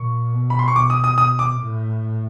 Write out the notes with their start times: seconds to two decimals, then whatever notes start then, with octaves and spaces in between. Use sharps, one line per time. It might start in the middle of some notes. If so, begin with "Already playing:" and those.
Already playing: A#2 C#6
0.33 B2
0.50 B5
0.59 C6
0.68 C#6
0.75 B2 D6
0.90 D#6
1.04 D#6
1.18 D#6
1.39 D6
1.60 A2